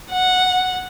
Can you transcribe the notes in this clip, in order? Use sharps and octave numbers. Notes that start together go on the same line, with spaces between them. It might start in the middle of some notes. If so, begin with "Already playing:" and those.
F#5